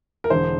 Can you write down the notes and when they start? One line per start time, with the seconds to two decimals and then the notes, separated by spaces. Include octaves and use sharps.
0.24 A#4
0.30 E1 E2 D3 C5